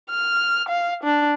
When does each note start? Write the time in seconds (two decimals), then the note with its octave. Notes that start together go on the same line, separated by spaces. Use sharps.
0.10 F6
0.69 F5
1.04 D4